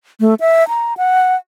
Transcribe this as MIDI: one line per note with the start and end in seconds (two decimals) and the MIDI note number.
0.20 0.34 57
0.40 0.67 76
0.68 0.94 82
0.97 1.36 78